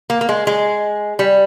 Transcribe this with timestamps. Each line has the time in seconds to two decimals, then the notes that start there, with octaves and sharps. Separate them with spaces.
0.10 A#3
0.21 A#3
0.29 G#3
0.47 G#3
1.19 G3